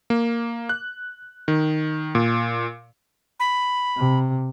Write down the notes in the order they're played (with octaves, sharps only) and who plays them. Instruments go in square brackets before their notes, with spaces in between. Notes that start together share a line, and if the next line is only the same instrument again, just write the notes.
[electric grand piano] A#3
F#6
D#3
A#2
[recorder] B5
[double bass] C3